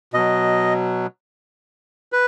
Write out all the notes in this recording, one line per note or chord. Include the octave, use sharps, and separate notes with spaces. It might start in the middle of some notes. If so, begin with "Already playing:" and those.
B2 F#3 D#5
B4